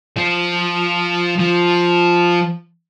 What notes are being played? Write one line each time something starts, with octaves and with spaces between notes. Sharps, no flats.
F3
F3